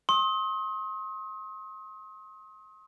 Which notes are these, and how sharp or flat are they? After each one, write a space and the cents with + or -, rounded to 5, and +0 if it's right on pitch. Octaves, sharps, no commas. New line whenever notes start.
C6 +35 D#6 +35